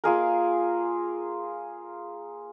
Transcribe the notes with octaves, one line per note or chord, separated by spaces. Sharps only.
A#3 F4 G#4 A#4